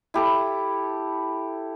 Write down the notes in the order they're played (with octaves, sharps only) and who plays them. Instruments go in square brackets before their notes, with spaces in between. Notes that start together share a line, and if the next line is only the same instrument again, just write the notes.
[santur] E4 G4 A4